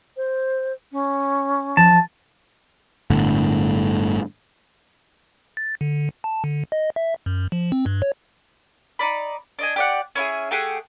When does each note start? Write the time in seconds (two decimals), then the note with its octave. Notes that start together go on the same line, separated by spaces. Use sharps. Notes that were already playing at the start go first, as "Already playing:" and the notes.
0.17 C5
0.92 C#4
1.77 F3 A5
3.10 G1 A2 D3
5.57 A6
5.81 D3
6.24 A5
6.44 D3
6.72 D#5
6.96 E5
7.26 F#2
7.52 F3
7.72 C4
7.86 G2
8.02 C#5
8.99 D#4 D5 B5
9.59 D4 D#5 G#5
9.76 G4 D5 F#5
10.15 C#4 E4 F4 G#4
10.51 A3 G4 G#4 F#5